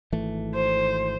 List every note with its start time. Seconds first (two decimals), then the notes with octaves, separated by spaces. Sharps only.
0.12 G#1 E3 A3
0.55 C5